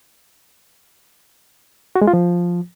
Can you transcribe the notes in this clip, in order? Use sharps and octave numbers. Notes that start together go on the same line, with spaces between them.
F#4
G#3
F4
F3